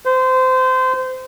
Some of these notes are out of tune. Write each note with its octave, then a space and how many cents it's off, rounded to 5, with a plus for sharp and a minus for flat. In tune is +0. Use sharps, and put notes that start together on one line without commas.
C5 -25